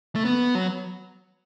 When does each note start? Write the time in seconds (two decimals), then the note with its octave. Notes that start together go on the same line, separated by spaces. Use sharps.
0.15 A3
0.25 B3
0.55 F#3